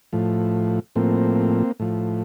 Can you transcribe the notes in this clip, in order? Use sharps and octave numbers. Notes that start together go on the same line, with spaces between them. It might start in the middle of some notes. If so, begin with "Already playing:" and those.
A2 F3
A2 F3 A#3 C4
A2 F3